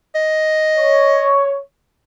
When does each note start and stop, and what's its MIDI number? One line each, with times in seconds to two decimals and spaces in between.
0.15 1.36 75
0.76 1.59 73